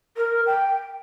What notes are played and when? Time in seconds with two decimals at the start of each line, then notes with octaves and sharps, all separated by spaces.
0.17 A#4
0.46 G5